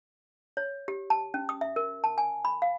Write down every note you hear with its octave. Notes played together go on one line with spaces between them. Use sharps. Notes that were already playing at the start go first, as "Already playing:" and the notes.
C#5
G4
A5
C#4
D#6
E5
A#4
A5
G#5
B5
F5